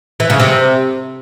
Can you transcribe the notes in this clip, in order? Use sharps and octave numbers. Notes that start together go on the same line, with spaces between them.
E3
C#3
C3